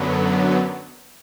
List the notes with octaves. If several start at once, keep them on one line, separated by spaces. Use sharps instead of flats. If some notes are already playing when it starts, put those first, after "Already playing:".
Already playing: F#2 D3 F#3 B3